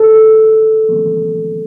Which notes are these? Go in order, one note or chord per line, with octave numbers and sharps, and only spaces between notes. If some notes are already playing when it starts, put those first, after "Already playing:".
Already playing: A4